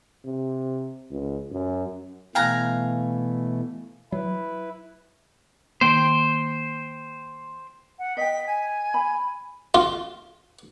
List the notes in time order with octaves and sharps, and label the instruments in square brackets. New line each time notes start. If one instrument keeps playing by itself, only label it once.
[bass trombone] C3
C#2
F#2
[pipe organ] B2 E3 A3 [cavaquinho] F5 G#5 A#5 [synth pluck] G5 F#6
[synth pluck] F#3 [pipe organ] E4 B4
[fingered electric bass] D#3 A#3 [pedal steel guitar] C5 G5
[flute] F#5
[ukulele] D#5 G5 [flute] B6
[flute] G#5
[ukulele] B5
[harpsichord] F4